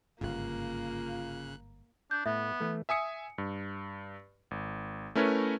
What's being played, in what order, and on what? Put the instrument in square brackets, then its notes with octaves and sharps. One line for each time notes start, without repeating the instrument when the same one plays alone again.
[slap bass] G1 G#2 [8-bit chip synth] C#3 F#6 [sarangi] A#3 [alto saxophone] F4
[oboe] D4 [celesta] G6
[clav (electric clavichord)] A2 [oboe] B3 [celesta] E5
[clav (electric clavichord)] E3 A3
[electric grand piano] E5 G#5 D#6 C#7
G2
G#1
A3 C#4 E4 A#4 B4 C#5